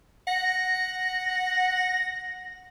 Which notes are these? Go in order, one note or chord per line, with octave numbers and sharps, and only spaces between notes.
F#5 A#6